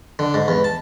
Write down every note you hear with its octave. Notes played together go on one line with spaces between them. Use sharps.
D3
G#2
E2
A5